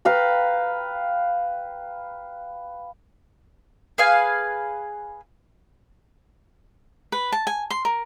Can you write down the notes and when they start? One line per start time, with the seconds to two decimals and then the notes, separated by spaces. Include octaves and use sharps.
0.05 B4 F5 G5 A#5
3.98 G#4 B4 F5 G#5
7.12 B4
7.32 A5
7.47 G#5
7.70 C6
7.85 A#4